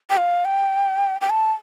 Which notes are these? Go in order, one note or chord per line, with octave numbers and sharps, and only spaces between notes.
G5
F5
G5
G5
A5